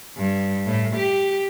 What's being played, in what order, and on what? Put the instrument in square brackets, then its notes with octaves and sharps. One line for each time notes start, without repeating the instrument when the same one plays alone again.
[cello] G2
A2
G4